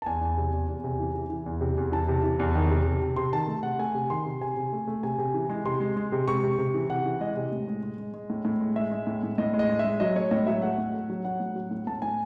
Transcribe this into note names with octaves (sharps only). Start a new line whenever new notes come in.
A5
E2 G#5
E2
C3
E2
E2
C3
E3
E3
E3
E2
C3
E2
E3 A5
C3
E3
E2
D#3
C3
C3
C3
C3 C6
D#3 A5
A3
C3 F#5
A3 G#5
C3
D#3 C6
C3
C3 G#5
C3
A3
A3
C3 G#5
C3
E3
G#3
C3 C6
G#3
G#3
C3
C3 C#6
C3
C3
E3
C3 F#5
E3
G#3 D#5
C3
A2
G#3
G#3
G#3
G#3
A2
A2
G#3
G#3 E5
G#3
A2
A2
A2 D#5
G#3
D#5
G#3
G#3 E5
F#3 D#5
A3 C#5
A2 D#5
F#3 E5
A3 F#5
A2
A3
F#3
F#3 F#5
A2
F#3
A2
A2 A5
A2 G#5